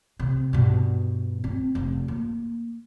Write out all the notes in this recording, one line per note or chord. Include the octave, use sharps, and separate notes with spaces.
C3
G2 B2
C4
F1
A#3